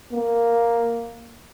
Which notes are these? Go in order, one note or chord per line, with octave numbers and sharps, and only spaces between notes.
A#3